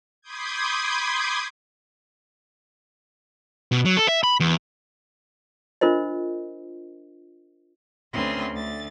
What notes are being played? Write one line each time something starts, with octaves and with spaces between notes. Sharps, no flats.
B5 C6 D6 D#6 G6 G#6
B2
F#3
A4
E5
B5
E2
D4 F4 A#4 C5 D#5
D2 C4 C#4 B4 C6
D2 A6